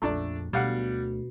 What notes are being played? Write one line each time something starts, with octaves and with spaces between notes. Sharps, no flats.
A#1 F2 A3 D4 D5
D2 B2 G3 F5 F#5